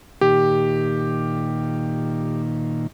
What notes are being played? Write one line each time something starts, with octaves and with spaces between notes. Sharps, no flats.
A#2 D#3 G4